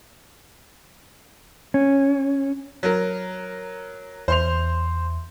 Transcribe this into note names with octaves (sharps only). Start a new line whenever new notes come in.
C#4
F#3 A#4
E2 C5 C6 F7